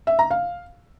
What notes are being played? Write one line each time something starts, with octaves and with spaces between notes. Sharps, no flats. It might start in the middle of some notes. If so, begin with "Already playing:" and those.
E5
A#5
F5